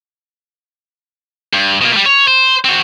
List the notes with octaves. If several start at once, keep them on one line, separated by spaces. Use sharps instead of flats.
G2
B2 A#3
G3 A3
C#5
C5
C4 F#4